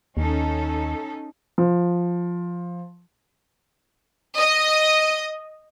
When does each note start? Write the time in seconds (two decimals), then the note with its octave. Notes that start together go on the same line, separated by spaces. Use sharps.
0.17 D#2 C#4 D#4 A4
1.58 F3
4.37 D#5